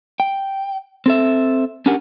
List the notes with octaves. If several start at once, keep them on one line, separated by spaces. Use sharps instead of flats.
G5
C4 A4 E5
C#4 D4 G4 A#4 F#5 G#5